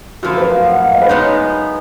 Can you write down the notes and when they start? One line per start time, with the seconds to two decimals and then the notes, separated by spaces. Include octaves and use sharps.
0.23 F#2 F3 A#3 F#4
0.37 B4
0.51 F5
0.66 F#5
0.80 F5
0.91 F5
0.95 D#5
1.02 B4
1.09 F#2 C#3 G#3 B3 D#4 C#5